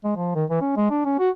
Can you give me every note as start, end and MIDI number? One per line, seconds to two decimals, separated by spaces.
0.04 0.13 56
0.17 0.35 53
0.35 0.44 51
0.50 0.61 52
0.61 0.75 61
0.76 0.91 56
0.91 1.03 62
1.05 1.18 61
1.19 1.29 66